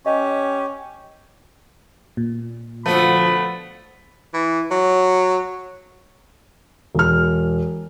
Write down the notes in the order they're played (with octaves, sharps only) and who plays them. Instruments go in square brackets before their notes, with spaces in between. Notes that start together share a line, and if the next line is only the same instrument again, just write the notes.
[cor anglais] C#4 [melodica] G4 [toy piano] D#5
[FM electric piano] A#2
[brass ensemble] D2 D3 F3 [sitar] A3 B3 B4 [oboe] B5
[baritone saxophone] E3
F#3
[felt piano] E1 F6